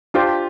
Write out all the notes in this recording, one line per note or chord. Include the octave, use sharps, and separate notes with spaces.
D4 F4 G4 C5